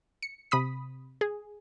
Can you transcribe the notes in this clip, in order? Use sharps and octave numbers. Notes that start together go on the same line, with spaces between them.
C#7
C3 B5 D#6 B6
G#4